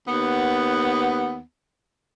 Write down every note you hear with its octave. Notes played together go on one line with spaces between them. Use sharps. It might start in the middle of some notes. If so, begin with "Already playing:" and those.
D#2 B3